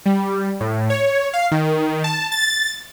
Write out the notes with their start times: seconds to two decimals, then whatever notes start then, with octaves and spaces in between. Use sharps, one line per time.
0.06 G3
0.60 A2
0.90 C#5
1.33 F5
1.51 D#3
2.04 A5
2.32 A6